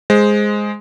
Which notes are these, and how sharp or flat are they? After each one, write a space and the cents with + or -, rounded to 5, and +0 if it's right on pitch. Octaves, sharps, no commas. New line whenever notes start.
G#3 +0 C5 +0